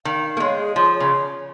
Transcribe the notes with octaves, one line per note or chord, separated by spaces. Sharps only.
D#3 F5
F5
A#3
G#3 C#5
G#4
F3 G#4
C#5
C#3